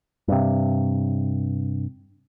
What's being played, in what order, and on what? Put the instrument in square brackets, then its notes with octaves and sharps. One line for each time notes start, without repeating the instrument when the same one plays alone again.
[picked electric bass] G2 C3